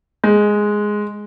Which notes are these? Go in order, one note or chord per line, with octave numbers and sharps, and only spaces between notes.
G#3